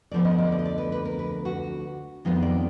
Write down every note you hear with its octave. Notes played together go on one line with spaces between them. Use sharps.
D2 D3 F3 B3 D5
D#5
D5
D5
D#5
D5
B4
B4
A#4
B4
F#4
F2 D#3 G#3 B3 F4
D5